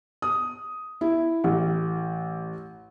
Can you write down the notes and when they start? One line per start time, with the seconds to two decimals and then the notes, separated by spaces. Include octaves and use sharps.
0.22 D#6
1.01 E4
1.44 A1